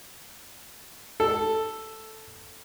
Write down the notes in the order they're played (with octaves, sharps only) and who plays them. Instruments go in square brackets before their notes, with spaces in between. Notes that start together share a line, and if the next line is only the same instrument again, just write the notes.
[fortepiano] A4